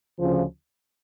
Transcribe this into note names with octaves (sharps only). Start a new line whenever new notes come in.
D2 C#3 F3